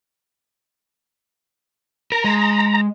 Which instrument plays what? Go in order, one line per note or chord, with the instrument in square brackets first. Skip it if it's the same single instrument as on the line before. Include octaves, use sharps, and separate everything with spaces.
[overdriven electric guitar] A#4 [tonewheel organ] A#5
[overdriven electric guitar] G#3